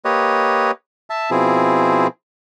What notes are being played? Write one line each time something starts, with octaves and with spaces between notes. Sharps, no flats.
A#3 G4 B4 C#5 D#5
E5 A5
B2 F3 C4 E4 G#4